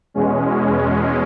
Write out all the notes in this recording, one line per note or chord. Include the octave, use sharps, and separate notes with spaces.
E2 B2 G#3 C#4